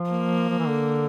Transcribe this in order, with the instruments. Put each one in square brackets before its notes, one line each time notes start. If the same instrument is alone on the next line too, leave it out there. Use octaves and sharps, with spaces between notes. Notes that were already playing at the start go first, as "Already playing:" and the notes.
Already playing: [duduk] F3
[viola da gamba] A#3
[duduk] F3
E3
D3